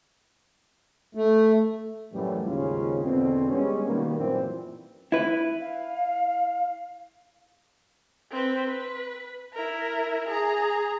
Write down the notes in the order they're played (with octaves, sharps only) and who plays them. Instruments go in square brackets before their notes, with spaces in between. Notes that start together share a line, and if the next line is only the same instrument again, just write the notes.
[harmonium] A3
[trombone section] F#2 A2 E3 F#3 G3
D#2 G#2 C#3 C#4 F4
E2 B2 D3 C4
G3 G#3 B3 C#4
B2 D#3 G3 A#3
F#2 A#2 E3 C4
[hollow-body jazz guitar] E4 B4
[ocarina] F5
[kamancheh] C4 B4
B4
E4 A#4
G#4 A#5